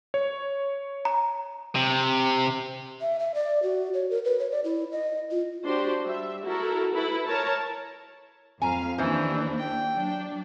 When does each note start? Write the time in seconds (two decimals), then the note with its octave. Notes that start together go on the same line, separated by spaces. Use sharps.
0.14 C#5
1.05 A#5
1.75 C3
3.01 E5
3.19 E5
3.34 D5
3.63 F#4
3.94 C#5
4.10 A#4
4.25 B4
4.39 C#5
4.51 D5
4.64 E4
4.92 D#5
5.31 F4
5.66 D4 F#4 G4 C5 C6
6.04 G3 E5
6.43 E4 F#4 A4 A#4
6.95 E4 A4 B4 B5
7.26 A#4 C#5 A5
8.62 F2 F5 G#5 A#5
8.98 D#2 E3 C#4 D4 C5
9.59 G5
9.91 F#3 D4